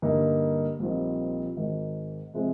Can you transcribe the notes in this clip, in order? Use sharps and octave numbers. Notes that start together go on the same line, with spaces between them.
G2 D3 G3 A#3 D#4
A#1 A#2 G3 C4 D#4
G#1 G#2 D#3
C3 F3 G#3 C4